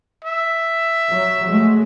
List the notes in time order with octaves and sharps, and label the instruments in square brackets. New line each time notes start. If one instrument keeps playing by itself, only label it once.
[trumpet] E5
[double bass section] F#3
F#3 G#3 A3